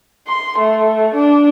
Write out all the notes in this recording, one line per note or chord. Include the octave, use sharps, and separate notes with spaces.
C6
A3
D4